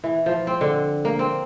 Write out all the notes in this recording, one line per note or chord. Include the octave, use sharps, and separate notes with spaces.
E3
F3
C4
D3
A#3
C4